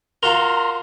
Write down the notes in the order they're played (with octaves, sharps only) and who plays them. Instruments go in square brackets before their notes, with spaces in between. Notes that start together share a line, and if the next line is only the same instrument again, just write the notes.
[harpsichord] F4 F#4 A#4 [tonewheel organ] A#5 C6